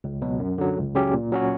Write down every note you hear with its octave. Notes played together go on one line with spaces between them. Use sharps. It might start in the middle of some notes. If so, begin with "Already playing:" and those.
C#2
B2 F#3
F#2
D3 F#3
C#2
C#3 F#3 C#4 G4
A#2
F#3 C#4 F#4